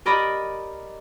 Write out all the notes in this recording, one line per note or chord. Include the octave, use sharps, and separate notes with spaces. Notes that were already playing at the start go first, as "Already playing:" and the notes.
G4 A#4 D5 D#5 B5